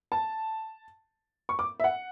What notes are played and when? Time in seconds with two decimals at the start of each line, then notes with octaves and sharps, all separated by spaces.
0.12 A5
1.49 C#6
1.59 D6
1.80 E5
1.84 F#5